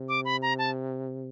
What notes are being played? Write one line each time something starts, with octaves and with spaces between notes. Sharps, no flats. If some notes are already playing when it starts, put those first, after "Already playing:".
Already playing: C3
D6
B5
A#5
A5